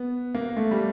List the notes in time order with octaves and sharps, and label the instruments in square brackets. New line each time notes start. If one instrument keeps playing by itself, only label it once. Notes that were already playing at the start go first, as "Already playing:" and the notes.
Already playing: [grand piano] B3
A#3
A3
G3